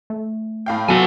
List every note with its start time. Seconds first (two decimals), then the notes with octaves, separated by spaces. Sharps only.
0.10 A3
0.66 A2 F5 G5
0.89 F#3 B3 F4 F#4 A4 G#5